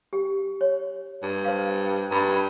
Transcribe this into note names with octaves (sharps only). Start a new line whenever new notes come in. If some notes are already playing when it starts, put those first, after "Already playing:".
G4
C#5
G2
C5 F5
G2 A#5 B5